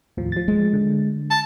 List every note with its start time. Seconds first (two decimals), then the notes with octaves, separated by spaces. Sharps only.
0.17 D#2 A2 F3
0.32 F3 A6
0.48 G#3
0.73 D3
1.30 A5